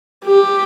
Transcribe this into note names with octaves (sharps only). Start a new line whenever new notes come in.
G4